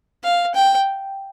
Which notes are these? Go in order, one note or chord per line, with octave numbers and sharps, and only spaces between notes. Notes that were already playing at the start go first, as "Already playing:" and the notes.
F5
G5